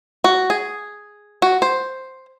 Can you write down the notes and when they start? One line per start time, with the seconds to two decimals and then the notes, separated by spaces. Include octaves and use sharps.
0.24 F#4
0.50 G#4
1.42 F#4
1.62 C5